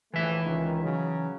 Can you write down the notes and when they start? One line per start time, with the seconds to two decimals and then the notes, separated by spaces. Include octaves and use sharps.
0.14 A#1 A2 E3 A3 E5
0.43 C#2 D#3
0.83 C#3 F#3